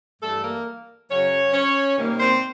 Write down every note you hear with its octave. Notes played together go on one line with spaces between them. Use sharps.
G2 E3 G3 A3 A4
A#3 A#4
F#2 C#3 F#3 C#4 C#5
C#4 C#5
C3 D#3 G3 A#3
C4 C5